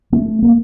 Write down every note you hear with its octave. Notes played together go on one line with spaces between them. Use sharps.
A3
A#3